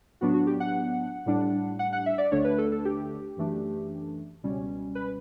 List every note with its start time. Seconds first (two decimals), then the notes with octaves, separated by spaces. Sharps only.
0.21 A2 F#3 B3 D4 F#4
0.34 F#4
0.47 G4
0.60 F#5
1.26 A2 G3 D4
1.79 F#5
1.93 F#5
2.06 E5
2.18 D5
2.31 D2 D3 A3 D4 C#5
2.44 B4
2.58 A4
2.72 A4
2.85 G4
3.37 F#2 E3 A3 D4
4.43 C#2 B2 G3 C#4
4.95 B4